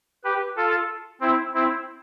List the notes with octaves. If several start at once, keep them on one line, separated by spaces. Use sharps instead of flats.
G4 B4
F4 A4
C4 E4
C4 E4